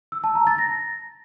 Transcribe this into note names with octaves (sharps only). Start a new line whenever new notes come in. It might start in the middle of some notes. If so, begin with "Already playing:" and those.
E6
A5
A#5
A6
A#6